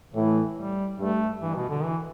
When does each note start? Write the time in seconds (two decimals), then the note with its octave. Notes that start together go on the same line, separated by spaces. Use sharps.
0.13 A2 E3
0.56 G3
0.99 G2 A3
1.41 G2 E3
1.55 B2
1.70 D3
1.83 E3